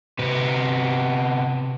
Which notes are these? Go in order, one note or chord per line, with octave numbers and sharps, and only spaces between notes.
C3 B3